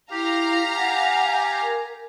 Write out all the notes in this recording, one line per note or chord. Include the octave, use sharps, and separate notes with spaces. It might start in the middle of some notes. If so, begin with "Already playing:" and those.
E4 G4 F5 A#5
F#5 G#5
A#4